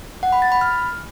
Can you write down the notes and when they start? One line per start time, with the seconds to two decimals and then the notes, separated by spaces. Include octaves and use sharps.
0.23 F#5
0.32 B5
0.42 A6
0.52 B5
0.61 F6